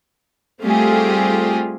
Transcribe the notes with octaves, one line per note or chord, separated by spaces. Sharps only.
G3 A3 C4 F4 G4 G#4